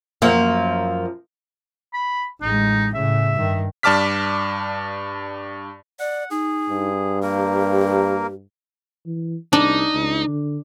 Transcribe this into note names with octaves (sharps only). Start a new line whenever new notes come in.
F#2 F3 A#3
B5
A1 G#3 D#4
A2 C#3 E5
G2 D#3
G2 D5 A5 D6 F6 B6
D5 F#5
D#4 G#4
G2
A#3 G4 A#4
E3
C2 D4 D#4
C#2
D3